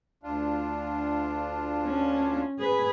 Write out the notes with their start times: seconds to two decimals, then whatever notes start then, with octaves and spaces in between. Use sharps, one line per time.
0.23 D2 D4 F4
1.84 C#4
2.59 G#4 B4